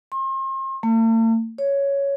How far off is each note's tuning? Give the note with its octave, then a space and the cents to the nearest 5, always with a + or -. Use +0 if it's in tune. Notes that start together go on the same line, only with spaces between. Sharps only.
C6 +40
A3 +45
C#5 +5